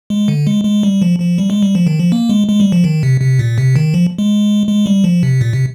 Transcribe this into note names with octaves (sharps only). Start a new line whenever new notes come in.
G#3
D3
G#3
G#3
G3
F3
F3
G3
G#3
G3
F3
D#3
F3
A#3
G#3
G#3
G3
F3
D#3
C3
C3
A#2
C3
D#3
F3
G#3
G#3
G3
F3
C3
A#2
C3